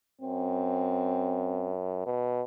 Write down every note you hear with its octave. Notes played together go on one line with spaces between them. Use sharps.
F#2 C4
B2